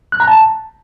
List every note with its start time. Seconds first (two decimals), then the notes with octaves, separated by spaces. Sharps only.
0.12 F#6
0.20 A#5
0.28 A5